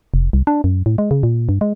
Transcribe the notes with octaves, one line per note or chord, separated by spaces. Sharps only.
F1
C2
D4
F#2
A2
G#3
C#3
A#2
G2
G#3